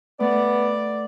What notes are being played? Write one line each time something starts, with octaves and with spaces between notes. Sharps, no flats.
A3 B3 D5